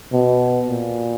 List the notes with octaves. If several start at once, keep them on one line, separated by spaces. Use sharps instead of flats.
B2
A#2